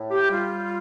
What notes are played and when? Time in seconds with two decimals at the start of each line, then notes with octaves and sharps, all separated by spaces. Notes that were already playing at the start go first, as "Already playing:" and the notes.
Already playing: A2
0.11 G4
0.30 G3 F4